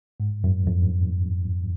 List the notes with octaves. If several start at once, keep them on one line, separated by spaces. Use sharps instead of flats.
G#2
F#2
F2